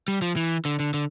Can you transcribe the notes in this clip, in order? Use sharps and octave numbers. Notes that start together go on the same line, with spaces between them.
G3
F3
E3
D3
D3
D3